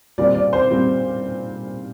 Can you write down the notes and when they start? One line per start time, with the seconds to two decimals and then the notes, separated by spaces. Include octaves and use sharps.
0.18 A#2 G3 C4 D5
0.35 D5
0.53 C5
0.70 A#2 G3 C4